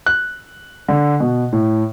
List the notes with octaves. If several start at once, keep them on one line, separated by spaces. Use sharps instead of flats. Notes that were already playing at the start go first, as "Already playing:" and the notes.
F#6
D3
B2
A2